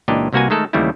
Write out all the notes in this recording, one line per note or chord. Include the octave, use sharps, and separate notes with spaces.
C#2 A#2 E3 D4 G4 D#5
C2 C3 A#3 F#4 B4 G#5
D#3 G#3 A3 A4 A#4
D#2 C#3 E3 G3 A3 E4